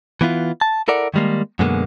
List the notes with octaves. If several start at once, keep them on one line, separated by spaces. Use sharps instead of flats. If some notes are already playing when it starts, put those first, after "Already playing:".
E3 B3 E4 F4
A5
E4 A4 A#4 D5 F#5
D#3 E3 G3 G#3 A#3
F#2 B2 D3 G#3 A#3 B3